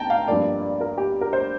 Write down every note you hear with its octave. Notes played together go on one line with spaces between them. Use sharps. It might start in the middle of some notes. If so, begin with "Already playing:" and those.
Already playing: G2 D#3 G5 A5 A#5
F5
G2 F3 A#3 D5
D5
A#4
G4
A#4
C5